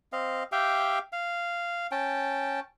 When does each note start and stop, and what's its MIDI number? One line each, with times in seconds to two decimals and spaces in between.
0.12 0.43 60
0.12 0.43 75
0.12 0.43 77
0.52 0.99 67
0.52 0.99 76
0.52 0.99 77
0.52 0.99 79
1.12 1.87 77
1.91 2.60 61
1.91 2.60 79
1.91 2.60 81